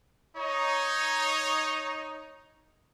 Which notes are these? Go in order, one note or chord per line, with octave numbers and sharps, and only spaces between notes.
D#4 C#5